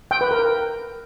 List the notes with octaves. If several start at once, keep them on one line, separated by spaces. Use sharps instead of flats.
G5
B4
A#4